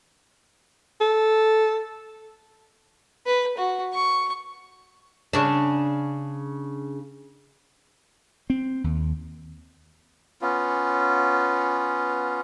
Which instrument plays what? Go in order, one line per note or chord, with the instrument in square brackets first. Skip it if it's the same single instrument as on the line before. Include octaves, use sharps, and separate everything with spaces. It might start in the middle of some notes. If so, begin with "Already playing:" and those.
[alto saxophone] A4
[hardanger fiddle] B4
F#4
C#6
[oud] C#3 D4
[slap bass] C4
D#2
[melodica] B3 C#4 F4